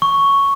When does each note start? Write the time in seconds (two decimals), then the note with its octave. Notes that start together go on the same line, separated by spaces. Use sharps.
0.02 C#6